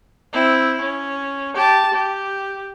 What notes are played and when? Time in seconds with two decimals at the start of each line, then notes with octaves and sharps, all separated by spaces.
0.33 C4 E4
0.81 C#4
1.55 G4 A5
1.94 G4